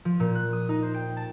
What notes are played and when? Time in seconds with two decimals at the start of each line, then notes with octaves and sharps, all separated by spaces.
0.05 F3
0.20 A#2
0.35 F#6
0.53 D#6
0.69 D#4
0.83 C5
0.94 G5
1.17 A5